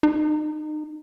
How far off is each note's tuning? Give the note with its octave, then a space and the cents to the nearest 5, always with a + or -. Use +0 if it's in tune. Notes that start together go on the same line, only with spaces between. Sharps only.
D#4 -30